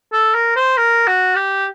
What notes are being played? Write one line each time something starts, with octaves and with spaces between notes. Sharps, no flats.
A4
A#4
C5
A#4
F#4
G4